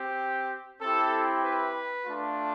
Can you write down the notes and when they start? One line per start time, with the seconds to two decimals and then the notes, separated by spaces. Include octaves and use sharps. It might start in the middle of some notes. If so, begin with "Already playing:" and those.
Already playing: C4 G4
0.81 C4 E4 G4 A4
1.44 B4
2.05 A3 D4 F4